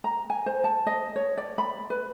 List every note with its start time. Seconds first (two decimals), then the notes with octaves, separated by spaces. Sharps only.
0.04 A#5
0.30 G#5
0.46 C5
0.64 A5
0.87 D#5
1.16 C#5
1.38 D5
1.58 B5
1.90 B4